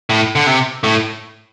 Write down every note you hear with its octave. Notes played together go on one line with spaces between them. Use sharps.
A2
D3
C3
A2